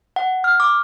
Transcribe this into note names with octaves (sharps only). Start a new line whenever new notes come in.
F#5
F6
D6